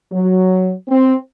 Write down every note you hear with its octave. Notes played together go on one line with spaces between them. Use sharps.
F#3
C4